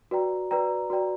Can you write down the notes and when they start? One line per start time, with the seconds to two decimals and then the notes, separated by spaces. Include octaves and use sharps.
0.11 F#4 B4 D5 G5 A#5
0.51 F#4 B4 D5 G5 A#5
0.90 F#4 B4 D5 G5 A#5